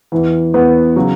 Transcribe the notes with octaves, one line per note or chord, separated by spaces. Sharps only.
E2 E3
E2 E3 B3
C#3 F#3